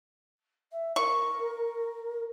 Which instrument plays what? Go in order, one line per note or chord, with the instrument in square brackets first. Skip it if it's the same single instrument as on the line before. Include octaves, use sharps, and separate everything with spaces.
[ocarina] E5
[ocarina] A#4 [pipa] C#6